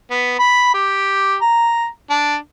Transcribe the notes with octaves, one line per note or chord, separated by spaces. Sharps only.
B3
B5
G4
A#5
D4